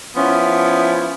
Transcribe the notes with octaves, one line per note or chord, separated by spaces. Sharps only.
F3 B3 C#4 E4